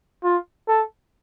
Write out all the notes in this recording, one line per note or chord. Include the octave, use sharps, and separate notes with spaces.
F4
A4